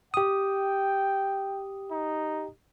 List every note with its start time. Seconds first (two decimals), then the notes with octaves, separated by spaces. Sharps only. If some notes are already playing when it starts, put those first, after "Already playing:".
0.14 G4 G5 D#6
1.91 D#4